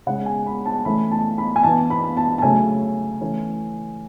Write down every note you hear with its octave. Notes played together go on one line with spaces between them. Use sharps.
C#3 G#3 C#4 F#5
G#5
B5
A5
E3 A3 C#4 B5
A5
B5
G#5
E3 B3 A5
B5
A5
A5
C#3 F#3 A3 C#4 G#5
E3 A3 C#4